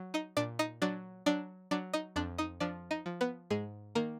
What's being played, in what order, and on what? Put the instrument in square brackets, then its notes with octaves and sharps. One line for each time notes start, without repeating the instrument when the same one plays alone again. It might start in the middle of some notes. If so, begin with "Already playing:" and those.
Already playing: [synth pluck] F#3
D#4 D#5
A#2 D4 D5
D#4 D#5
F#3 D4 D5
F#3 D4 D5
F#3 D4 D5
D#4 D#5
F2 D4 D5
D#4 D#5
F3 D4 D5
D#4 D#5
F3
B3 B4
G#2 G#3 G#4
D#3 A#3 A#4